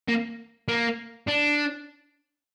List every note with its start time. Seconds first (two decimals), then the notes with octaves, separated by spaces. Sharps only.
0.08 A#3
0.68 A#3
1.28 D4